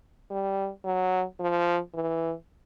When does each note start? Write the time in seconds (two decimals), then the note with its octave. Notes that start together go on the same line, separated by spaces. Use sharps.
0.30 G3
0.85 F#3
1.40 F3
1.94 E3